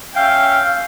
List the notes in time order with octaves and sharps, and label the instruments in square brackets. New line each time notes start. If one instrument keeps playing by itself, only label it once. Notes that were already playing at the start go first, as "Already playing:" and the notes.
[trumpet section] C#4 E5 G5 [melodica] F5